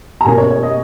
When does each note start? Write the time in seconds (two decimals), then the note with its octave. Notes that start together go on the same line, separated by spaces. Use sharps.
0.21 A#5
0.25 B2 A#3 C#4 G#5
0.38 C#5
0.50 C#5
0.63 D#5